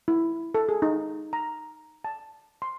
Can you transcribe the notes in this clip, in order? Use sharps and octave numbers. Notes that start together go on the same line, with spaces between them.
E4
A4
G#4
D#4
A#5
A5
C6